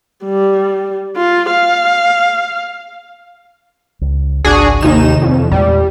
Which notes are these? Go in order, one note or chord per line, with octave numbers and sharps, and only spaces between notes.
G3
F4
F5
C#2
G#1 C#2 D4 F#4 G#4
D#2 C3 D#3 D#4 E7
F2
E2 A#2 G3 G#3